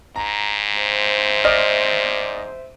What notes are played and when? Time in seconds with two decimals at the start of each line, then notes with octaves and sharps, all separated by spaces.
0.16 G#2 A#5
0.76 C5 E5
1.44 D5 D#5 F6